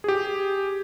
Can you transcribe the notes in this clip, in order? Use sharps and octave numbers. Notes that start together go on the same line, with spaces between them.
G4 G#4